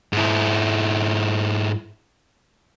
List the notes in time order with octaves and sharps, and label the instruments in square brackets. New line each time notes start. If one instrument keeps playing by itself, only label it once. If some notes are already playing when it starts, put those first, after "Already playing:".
[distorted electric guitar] G#2 E4